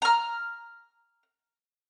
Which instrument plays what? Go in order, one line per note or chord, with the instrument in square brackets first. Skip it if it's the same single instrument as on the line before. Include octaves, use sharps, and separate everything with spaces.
[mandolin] A#5 F6